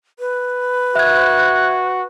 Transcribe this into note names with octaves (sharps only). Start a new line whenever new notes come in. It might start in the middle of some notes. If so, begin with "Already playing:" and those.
B4
F#4 E5 F#6 G#6